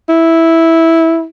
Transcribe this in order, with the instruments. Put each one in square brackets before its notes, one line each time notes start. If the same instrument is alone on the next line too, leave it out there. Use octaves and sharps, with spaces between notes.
[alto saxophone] E4